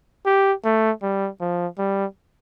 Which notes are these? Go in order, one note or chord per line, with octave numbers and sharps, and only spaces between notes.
G4
A3
G3
F3
G3